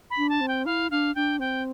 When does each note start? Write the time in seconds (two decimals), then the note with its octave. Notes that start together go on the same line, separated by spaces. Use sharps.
0.10 B5
0.17 D4
0.29 A5
0.41 C4
0.48 G5
0.66 E4 F5
0.91 D4 F5
1.15 D4 G5
1.39 C4 G5